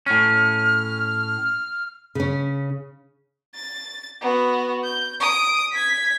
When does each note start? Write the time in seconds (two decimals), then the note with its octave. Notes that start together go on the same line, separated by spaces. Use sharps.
0.06 A2 C#4 F6
2.15 C#3 C#4
3.55 A6
4.21 B3 F#4
4.84 G6
5.20 D#6 D7
5.72 G#6 B6